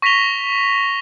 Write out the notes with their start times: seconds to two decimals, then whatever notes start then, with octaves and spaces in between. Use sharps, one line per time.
0.02 C#6 A#6 B6 D#7 F7 G7